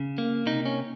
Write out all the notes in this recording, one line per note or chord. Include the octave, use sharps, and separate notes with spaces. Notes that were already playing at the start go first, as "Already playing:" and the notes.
Already playing: C#3
A#3
C3 D#4
C#4